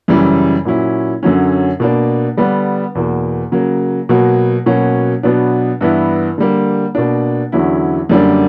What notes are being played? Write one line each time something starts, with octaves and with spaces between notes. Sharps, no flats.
F#2 C#3 E3 G3
A#2 F#3 C#4 E4
F#2 D3 F#3 C#4
B2 A#3 D4
D3 G3 B3 D4
E2 B2 A#3
C#3 F#3 A#3
B2 F#3 A#3
B2 F#3 A#3 C#4
B2 F#3 B3 D4
G2 E3 B3 E4
D3 G3 A#3
B2 A#3 D4
E2 D3 F#3 C#4 E4
F#2 D3 G3 A#3 D4